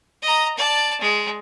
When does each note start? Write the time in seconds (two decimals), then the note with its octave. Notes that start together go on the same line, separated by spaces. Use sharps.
0.22 D#5 A#5
0.57 D5 A5
1.01 G#3